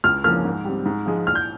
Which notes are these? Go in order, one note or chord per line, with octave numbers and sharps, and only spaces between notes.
C#2 F6
C#3 F3 A#3 F6
G#2
G3 C4
G#2
F3 G#3
A#1 F6
G6